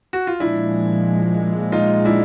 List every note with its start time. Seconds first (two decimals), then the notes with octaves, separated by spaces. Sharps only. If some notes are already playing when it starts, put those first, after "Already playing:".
0.13 F#4
0.27 F4
0.40 A#2 F3 G#3 D4 E4
1.72 D#4 F4
2.05 D4 E4